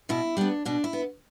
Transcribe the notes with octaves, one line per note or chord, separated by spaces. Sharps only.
B2 E4
G3 B3 D4
B2 D4
E4
B3